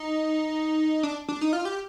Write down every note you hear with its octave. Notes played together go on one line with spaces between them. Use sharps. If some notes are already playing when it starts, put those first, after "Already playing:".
Already playing: D#4
D4
D4
D#4
F4
G4